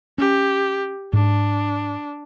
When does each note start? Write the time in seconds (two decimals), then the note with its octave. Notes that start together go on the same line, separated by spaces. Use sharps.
0.18 C#4 G4
1.13 G#2 D4